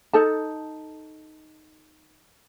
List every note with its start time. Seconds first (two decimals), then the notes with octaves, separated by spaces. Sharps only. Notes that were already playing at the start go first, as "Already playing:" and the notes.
0.13 D#4 A4 A5